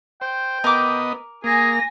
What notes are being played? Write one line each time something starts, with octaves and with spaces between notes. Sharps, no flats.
C5 G5
B3 A#4 D#5 D6
A#3 G#4 G#5 A#6